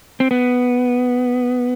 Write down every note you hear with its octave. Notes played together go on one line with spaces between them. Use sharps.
C4
B3